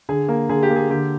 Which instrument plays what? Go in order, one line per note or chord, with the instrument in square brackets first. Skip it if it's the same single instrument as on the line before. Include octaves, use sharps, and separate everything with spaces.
[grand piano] D3 G#4
A#3
D3 G#4
G4
A#3
G#4
D3 G4